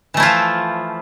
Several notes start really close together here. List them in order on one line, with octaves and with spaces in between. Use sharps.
E3 A3 E4 F4 F3